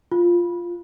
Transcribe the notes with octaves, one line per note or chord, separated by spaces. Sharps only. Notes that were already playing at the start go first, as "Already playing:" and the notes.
F4